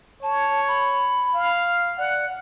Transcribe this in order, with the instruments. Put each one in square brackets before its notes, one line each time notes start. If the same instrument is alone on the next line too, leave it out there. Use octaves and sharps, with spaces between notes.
[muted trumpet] C#5 [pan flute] A5
[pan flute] B5
[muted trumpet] F5
[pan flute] D5 [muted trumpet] F#5